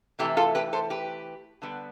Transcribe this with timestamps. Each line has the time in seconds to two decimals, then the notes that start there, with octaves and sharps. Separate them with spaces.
0.19 C3 E3 A3 E4 G4
0.37 F4 A4
0.55 G4 B4
0.73 A4 C5
0.90 G4 B4
1.62 D3 G3 B3